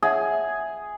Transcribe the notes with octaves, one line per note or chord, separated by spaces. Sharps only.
G#4 C#5 E5 F#5